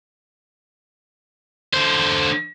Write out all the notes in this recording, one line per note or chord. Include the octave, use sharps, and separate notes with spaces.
D3 C5